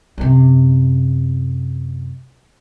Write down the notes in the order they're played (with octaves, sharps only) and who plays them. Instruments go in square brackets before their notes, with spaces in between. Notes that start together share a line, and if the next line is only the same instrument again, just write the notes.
[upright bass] F#2 C3